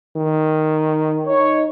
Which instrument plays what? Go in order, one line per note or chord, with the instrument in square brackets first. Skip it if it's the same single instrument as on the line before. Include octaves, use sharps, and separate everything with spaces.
[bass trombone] D#3
[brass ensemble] D#4 C#5